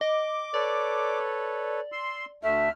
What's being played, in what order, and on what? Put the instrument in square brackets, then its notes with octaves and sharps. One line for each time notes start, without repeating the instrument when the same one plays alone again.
[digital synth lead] D#5 [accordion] D6
[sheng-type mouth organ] A4 B4 C#5 [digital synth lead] D5
[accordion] C6 [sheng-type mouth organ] E6
[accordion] D2 A3 [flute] E5 [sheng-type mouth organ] F6